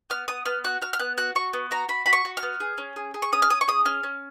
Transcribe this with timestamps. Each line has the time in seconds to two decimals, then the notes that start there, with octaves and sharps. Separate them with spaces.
0.10 B3 F6
0.28 B3 D#6
0.45 B3 F6
0.64 F#4 F#6
0.82 F#4 F6
0.93 F6
0.99 B3 F#6
1.18 F#4 F#6
1.35 F#4 C#6
1.53 B3
1.71 F#4 A#5
1.89 F#4 B5
2.06 F#4 B5
2.13 C#6
2.25 F#4
2.37 F6
2.43 B3
2.60 G#4
2.78 C#4
2.96 G#4
3.14 G#4
3.22 C#6
3.32 C#4 D#6
3.42 F6
3.50 C#4 D#6
3.61 C#6
3.68 G#4 D#6
3.85 C#4 F6
4.03 C#4